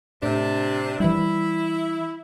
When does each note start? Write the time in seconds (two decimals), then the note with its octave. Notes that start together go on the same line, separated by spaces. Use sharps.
0.23 A2 C3 D4
1.00 E3 G3 E4